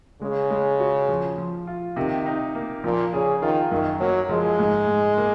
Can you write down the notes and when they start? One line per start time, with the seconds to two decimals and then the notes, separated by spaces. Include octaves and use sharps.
0.21 C#3 G#3
0.51 G#3
0.80 F#4
1.09 F3
1.38 F3
1.67 F4
1.96 C3 D#3
2.26 D#4
2.55 A#3
2.84 A#2 F3
3.13 C#3 G#4
3.42 D#3 F4
3.71 F#2 D#3
4.00 F#3 A#3
4.29 F3 G#3
4.59 G#2
4.88 G#2
5.18 A#3